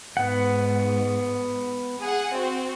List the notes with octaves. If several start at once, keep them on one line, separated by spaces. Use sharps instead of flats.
G#2 B3 F#5
G#4 F#5
C4 F#4